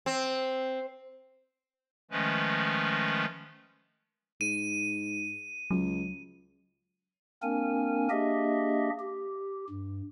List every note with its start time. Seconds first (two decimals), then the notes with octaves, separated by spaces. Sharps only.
0.06 C4
2.11 D#3 F3 G#3 A3 C#4 B4
4.41 G#2 D#7
5.71 C#2 F#3
7.42 A#3 C4 D4 A#4 G#5
8.10 A#3 D4 G4 G#4 D#5 E5
8.99 G4
9.70 G2